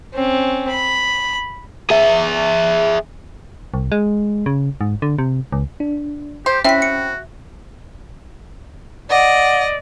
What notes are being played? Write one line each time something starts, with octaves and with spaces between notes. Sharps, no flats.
C4 C#4
B5
G#4 E5
C2
G#3
C#3
G#2
D3
C3
C#2
D4
G4 C5
C4 C#4 E4 F#4 E5 G5 B6
C#7
D5 D#5 F#5